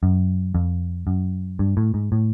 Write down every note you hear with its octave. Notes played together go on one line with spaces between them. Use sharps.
F#2
F2
F#2
G2
A2
G#2
A2